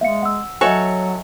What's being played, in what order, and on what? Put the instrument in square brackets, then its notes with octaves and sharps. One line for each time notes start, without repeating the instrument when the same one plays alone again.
[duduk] G#3 [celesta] E5 F5 C#7
[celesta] F#5 E6
[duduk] F#3 [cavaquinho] F#4 A4 C#5 [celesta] D#5 E5 G#5